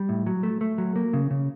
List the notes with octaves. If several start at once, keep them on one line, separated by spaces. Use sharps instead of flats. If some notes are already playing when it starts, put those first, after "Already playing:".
Already playing: G3
A2
F#3
A3
A3
F#3
A#3
C#3
C#3